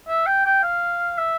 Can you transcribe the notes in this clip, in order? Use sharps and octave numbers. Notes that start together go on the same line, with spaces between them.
E5
G5
G5
F5
E5